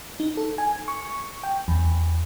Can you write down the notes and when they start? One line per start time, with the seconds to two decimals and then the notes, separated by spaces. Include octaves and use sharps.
0.20 D#4
0.37 A4
0.58 G#5
0.88 C#6
1.43 G5
1.68 E2